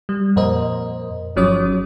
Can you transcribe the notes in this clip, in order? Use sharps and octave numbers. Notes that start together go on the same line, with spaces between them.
G3
F2 A#2 A#4 C5 D#5
G1 F3 F#3 C#4 C#5 D#6